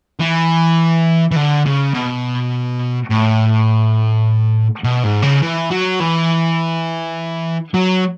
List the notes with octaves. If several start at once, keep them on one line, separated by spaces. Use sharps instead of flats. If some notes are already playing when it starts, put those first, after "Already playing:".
E3
E3
D3
C#3
B2
A2
B2
G#2
C#3
E3
F#3
E3
F#3